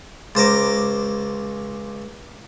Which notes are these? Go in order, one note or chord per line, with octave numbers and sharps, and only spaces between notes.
C#2 C5 A#5 D6